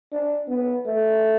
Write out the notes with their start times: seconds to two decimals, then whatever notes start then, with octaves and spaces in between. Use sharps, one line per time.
0.13 D4
0.49 B3
0.87 A3